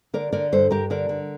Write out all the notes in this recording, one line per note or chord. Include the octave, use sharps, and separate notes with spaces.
D3 A#4 D5
D3 A#4 D5
G2 A4 C5
G2 G4 A#4
D3 A#4 D5
D3